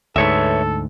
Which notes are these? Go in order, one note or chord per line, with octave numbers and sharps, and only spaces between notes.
D2 G#2 A4 B4 C#5 E5